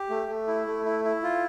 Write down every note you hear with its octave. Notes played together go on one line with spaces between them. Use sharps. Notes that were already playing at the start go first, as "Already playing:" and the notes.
Already playing: G4
A3
A3
E4
A3
E4
E4
F4